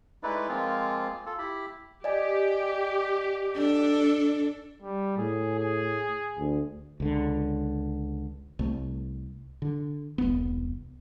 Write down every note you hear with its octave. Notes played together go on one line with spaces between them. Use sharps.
G#3 A3 D#4 E4 B4 D5
F3 G#3 A#3 C4 F4
F4 A4
E4 G4 B5
G4 D5 D#5 G#5
D4 A4
G3
A2 G#4
G#4
D2
C#2 D3
C2 A3
D3
E1 C2 B3